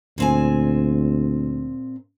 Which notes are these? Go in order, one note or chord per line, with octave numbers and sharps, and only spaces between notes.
D2 A#2 C4 G#5